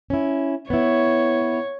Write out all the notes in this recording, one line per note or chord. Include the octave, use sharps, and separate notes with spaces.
C#4 E4
B3 E4 C#5